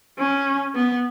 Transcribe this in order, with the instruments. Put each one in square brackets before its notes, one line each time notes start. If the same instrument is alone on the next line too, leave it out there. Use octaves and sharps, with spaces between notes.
[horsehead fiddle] C#4
B3